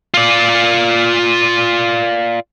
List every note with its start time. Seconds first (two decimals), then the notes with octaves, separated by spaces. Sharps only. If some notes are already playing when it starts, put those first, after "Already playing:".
0.14 F4 D5